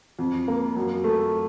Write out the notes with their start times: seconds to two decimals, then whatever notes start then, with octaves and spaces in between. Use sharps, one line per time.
0.19 F2
0.48 A#3
0.77 F#2
1.04 A3